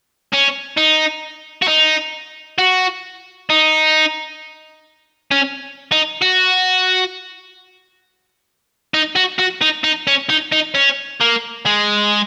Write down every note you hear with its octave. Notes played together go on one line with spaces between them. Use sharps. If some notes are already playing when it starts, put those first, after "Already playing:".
C#4
D#4
F#4
D#4
F#4
D#4
C#4
D#4
F#4
D#4
F#4
F#4
D#4
D#4
C#4
D#4
D#4
C#4
A#3
G#3